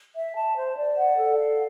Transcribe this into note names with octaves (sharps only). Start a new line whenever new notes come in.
E5
A5
C5
D5
F#5
A4
F5